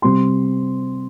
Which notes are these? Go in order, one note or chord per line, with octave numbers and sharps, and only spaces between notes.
C3 G3 C4 C6